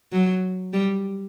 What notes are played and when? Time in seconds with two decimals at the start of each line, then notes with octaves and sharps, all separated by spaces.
0.12 F#3
0.73 G3